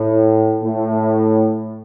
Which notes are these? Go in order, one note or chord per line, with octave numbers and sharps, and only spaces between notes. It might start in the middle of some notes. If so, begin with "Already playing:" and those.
Already playing: A2
A2